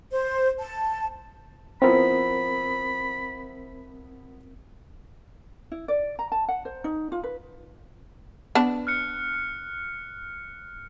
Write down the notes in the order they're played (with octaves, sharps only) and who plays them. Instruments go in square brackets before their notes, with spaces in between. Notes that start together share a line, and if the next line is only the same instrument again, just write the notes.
[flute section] C5
A5
[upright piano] F3 B3 E4 [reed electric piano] C4 A#4 [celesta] C5 [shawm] B5
[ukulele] E4
D5
A#5
A5
F#5
C5
D#4
F4
B4
[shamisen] B3 D4 A5
[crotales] F6 F#6 C#7